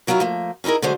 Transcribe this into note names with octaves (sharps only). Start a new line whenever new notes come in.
D#3 F#3 E4 F4 A#4
F3 A3 A#3
C#4 D#4 E4 G#4 A#4
D3 F#3 G#3 A3 C5